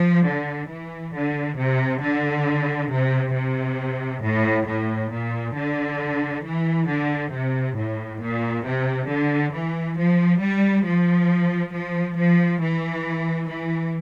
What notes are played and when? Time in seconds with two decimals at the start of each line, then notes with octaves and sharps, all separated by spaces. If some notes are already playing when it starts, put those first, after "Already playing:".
Already playing: F3
0.25 D3
0.69 E3
1.14 D3
1.57 C3
2.02 D3
2.90 C3
3.34 C3
4.23 A2
4.67 A2
5.11 A#2
5.55 D3
6.44 E3
6.88 D3
7.32 C3
7.77 A2
8.20 A#2
8.64 C3
9.08 D3
9.52 E3
9.97 F3
10.40 G3
10.85 F3
11.73 F3
12.17 F3
12.61 E3
13.49 E3